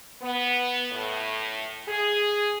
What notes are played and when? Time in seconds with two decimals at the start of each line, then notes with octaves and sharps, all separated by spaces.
0.22 B3
0.92 A2
1.88 G#4